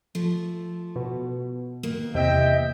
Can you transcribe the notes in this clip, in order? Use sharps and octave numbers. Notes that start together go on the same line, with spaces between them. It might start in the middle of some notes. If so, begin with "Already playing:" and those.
F3 A3
B2
D#2 A#3
E2 C3 D#5 E5 G5